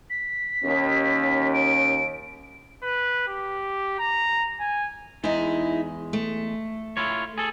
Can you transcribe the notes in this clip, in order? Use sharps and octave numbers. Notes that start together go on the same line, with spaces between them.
B6
D#2 C#4
D7
B4
G4
A#5
G#5
E2 G#3 D#4 E4
A3
E4 F4 C#5
G#4 A4